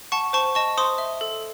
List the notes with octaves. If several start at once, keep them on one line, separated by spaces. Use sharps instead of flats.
F#5 A5 C#6
C5 A5 C#6
D#5 A5 C#6
C5 C6 D#6
E5
A4